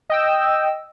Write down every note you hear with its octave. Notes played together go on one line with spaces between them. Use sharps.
D#5 G5 E6